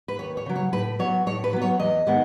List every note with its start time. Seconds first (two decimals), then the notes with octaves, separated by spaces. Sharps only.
0.08 B4
0.19 D#2 C#5
0.37 C#5
0.46 C#3 F#3
0.56 C#5
0.72 A2 B4
0.99 F#3 B3 C#5
1.26 A2 C#5
1.44 B4
1.53 F#3 B3
1.62 C#5
1.80 E2 D#5
2.07 D#3 G#3 B3